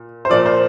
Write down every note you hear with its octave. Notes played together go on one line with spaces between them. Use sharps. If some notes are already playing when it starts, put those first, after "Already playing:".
Already playing: A#2
C5
A#2 F3 D5
C5